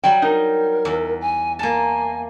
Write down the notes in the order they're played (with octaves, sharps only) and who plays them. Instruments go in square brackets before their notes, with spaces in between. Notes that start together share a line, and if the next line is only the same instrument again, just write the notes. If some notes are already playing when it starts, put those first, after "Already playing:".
[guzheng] F#3 G3 [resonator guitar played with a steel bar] G5
[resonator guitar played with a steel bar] D#4 [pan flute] A#4
[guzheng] E2
[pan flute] G#5
[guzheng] A#3 A5 [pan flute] G#5